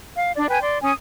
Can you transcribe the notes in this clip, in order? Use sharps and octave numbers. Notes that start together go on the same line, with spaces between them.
F5
D4 D5
B4 G5 G#5
D5 C6
C#4 G#5 D#6